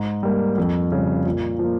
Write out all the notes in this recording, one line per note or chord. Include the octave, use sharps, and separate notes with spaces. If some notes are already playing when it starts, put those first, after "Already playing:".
Already playing: G#2
G3 A#3
F2
C#3 G3
A#2
F3
A#3